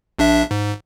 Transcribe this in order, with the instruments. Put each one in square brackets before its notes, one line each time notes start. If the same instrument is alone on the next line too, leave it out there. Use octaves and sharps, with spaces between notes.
[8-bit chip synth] A#1 D4 E5
G#2